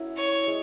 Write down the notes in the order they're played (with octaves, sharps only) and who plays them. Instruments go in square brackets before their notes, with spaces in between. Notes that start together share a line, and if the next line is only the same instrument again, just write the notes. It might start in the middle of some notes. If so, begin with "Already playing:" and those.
Already playing: [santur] C#4 E4 F#4 A#4
[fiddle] C#5
[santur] G#3